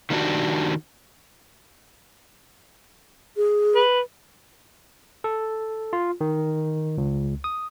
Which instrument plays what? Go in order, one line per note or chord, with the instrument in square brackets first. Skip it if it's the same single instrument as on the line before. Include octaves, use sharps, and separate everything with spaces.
[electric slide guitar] D#3 G3 A#3 D4 F#4 G4
[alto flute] G#4
[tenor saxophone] B4
[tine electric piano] A4
F4
D#3
C#2
D#6